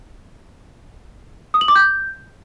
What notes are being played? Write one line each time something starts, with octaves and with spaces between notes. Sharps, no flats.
D#6
F#7
D6
G6